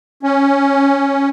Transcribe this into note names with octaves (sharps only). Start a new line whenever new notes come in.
C#4